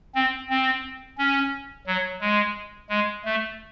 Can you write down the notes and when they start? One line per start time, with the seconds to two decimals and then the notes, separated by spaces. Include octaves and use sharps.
0.15 C4
0.50 C4
1.18 C#4
1.87 F#3
2.21 G#3
2.90 G#3
3.25 A3